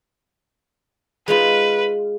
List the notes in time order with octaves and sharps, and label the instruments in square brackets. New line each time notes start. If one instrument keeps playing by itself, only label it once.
[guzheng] G#3 D#4 F4 [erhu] B4